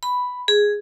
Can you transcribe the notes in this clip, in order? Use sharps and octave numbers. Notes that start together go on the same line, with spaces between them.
B5
G#4